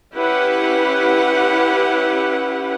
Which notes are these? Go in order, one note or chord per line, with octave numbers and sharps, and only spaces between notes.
C#4 E4 G4 B4 F#5